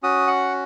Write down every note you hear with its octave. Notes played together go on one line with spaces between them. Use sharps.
C#4 F#4 D#6
F#5